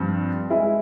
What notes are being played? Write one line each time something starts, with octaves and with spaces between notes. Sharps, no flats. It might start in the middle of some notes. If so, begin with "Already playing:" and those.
Already playing: G2 F3 C4
G#3 E4 G#4